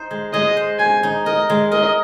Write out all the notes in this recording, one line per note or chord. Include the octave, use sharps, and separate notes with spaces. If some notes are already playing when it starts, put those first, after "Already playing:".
Already playing: D#4 C5
G#3
G#3 D#5
C5
C5 G#5
D#4
A#4 D#5
G#3
A#4 D#5